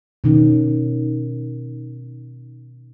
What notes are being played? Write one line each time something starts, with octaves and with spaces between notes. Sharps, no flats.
B2 D#3 C#4